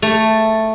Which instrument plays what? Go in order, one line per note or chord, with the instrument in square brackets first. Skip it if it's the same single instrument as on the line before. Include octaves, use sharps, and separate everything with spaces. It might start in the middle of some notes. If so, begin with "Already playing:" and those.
[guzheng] A3